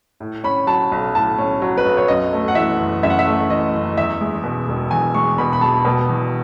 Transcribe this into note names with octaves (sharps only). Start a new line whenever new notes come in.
A2
C#4 B5
F#3 A5
B1
A2 A5
C#4
F#3
B4
B1
C#5
F#2 D#5
A3
F#5
E3 E5
F#1
F#2 E5
F#5
E5
A3
E3 D#5
F#1
E2 E5
G#3
B2
E1
E2 G#5
G#3 C#6
B2 B5
B5
E1 A5
B2
E2